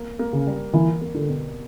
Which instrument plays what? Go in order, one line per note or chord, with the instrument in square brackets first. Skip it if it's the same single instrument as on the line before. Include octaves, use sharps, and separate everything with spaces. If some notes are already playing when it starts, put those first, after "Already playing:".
Already playing: [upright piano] A#3
A#3
[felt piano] C#3
[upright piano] G3
[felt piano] E3 [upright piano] A#3
[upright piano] A#3
[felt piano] D3
[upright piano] B2